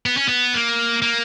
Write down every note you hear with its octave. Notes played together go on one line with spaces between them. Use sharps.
B3
C#4
B3
A#3
A#3